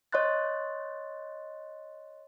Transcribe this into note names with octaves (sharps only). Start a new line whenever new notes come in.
C#5 D#5 C6 F#6 A6